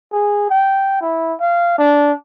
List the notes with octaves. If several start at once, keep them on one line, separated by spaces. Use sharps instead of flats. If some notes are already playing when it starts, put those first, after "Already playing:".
G#4
G5
E4
F5
D4